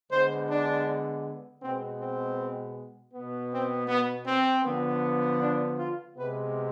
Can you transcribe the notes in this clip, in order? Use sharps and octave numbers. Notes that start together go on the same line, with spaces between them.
D3 G#3 B3 C5
D4
B2 G#3 B3 C4
C4
B3
B2
C4
B3
C4
D3 F3 B3
D4
F4
C3 G#3 B3 B4